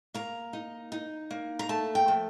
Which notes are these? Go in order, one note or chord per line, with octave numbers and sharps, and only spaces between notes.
A#3 A#5
D#4
D#4
A#3
A#5
A3 A5
G5
F3